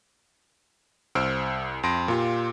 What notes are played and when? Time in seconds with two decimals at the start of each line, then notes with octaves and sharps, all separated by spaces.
1.15 C2 C5 E6 F6 D7
1.83 F2 C6 A#6 D7
2.08 A#2 F4 G4